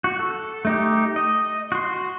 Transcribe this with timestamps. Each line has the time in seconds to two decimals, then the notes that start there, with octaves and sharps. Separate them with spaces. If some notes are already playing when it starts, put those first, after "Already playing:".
0.04 F#4
0.19 A4
0.65 A3 D#4 G4
1.16 D#5
1.72 F#4 C6